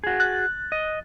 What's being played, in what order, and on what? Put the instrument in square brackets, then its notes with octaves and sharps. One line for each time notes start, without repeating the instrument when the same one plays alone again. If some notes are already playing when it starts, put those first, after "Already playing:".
[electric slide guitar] F#4 G#4
[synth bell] F#6 A6
[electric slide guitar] D#5